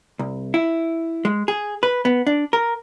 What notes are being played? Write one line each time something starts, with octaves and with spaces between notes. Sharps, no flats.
C2
E4
G#3
G#4
B4
B3
D4
A#4